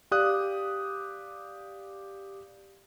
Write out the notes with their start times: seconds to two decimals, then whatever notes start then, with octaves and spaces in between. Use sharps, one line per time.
0.11 G4 D5 F5 D#6 F#6